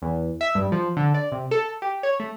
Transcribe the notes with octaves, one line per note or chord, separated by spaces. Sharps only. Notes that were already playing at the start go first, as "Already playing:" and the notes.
E2
E5
G2
F3
D3
D5
C3
A4
G4
C#5
A3